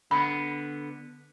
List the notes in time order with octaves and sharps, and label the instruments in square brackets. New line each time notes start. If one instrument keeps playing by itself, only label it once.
[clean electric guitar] D3 B3 [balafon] B5